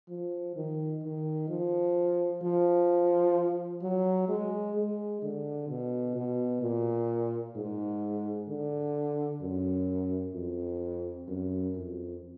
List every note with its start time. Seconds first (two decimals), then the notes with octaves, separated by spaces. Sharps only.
0.09 F3
0.56 D#3
1.03 D#3
1.48 F3
2.42 F3
3.82 F#3
4.29 G#3
4.76 G#3
5.22 D3
5.69 B2
6.16 B2
6.62 A#2
7.56 G#2
8.48 D3
9.42 F#2
10.34 F2
11.28 F#2
11.75 F2